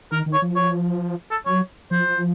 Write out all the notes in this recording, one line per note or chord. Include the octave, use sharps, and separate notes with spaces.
D#3 A#4
D#3
C#5
F3
C#5
A4
F#3 C#5
F3 C5